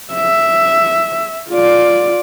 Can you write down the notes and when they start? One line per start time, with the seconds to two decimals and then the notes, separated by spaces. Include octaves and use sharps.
0.13 E5
1.50 F4 D5